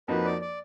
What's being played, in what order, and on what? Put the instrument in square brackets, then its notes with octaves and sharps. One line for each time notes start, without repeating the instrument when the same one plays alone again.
[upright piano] F2 F3 A#3 D#4 F#4 [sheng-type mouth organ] B4
[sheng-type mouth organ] D5
D5